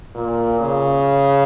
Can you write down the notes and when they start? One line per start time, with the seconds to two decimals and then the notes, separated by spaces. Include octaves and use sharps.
0.15 A#2
0.60 C#3